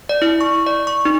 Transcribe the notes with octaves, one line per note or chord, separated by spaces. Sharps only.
D5
E4
C#6
D5
C#6
D#4